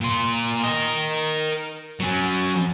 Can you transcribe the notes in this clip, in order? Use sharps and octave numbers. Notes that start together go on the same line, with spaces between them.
A#2 C6
A#4 D#5
F#3 C#4